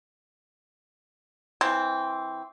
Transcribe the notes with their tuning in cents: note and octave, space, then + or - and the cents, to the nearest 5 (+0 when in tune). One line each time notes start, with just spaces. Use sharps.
E3 -10 C4 +0